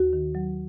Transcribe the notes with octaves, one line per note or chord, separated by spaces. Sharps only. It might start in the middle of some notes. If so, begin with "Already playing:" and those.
Already playing: D#2 F#4
D#3
F#3